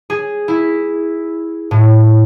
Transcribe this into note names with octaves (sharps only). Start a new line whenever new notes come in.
G#4
E4
A2